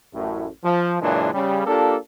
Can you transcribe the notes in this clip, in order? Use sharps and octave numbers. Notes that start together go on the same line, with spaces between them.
A1 F#2 A2
F3
F#2 A#2 C#3 E3 G#3 D4
C#3 G3
A#3 D4 F4 G4 A4